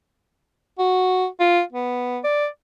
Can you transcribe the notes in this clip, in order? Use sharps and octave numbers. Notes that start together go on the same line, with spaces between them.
F#4
F4
B3
D5